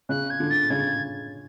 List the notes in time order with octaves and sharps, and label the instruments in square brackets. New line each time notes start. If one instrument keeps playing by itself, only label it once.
[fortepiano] C#3 [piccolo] F#6
[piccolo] G#6
[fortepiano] D3
[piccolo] A6
[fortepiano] C#3 [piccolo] G#6